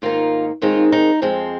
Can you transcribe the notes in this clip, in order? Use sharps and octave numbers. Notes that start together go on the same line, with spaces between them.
G#2 D#3 A#3 D#4 F4
D#2 D#3 G#3 C4 D#4 F4
D#4
F2 F3 G#3 C4